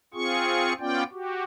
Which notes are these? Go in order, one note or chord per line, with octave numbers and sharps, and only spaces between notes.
C4 F4 G#4 C#6
B3 C#4 F4 D5 G5
F#4 G4